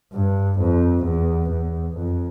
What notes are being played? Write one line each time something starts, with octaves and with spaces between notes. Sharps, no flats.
G2
F2
E2
E2
F2